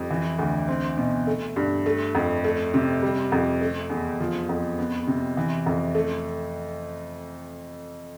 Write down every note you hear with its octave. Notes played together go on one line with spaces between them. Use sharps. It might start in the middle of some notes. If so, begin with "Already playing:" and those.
Already playing: F2 G3
E3
D2
C4
B2
A3
G2
A3
F2
A3
C3
G3
F2
A3
E2
F3
F2
B3
C3
E3
F2
A3